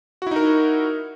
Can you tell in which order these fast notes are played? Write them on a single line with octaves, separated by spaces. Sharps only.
F#4 E4 D#4 A#4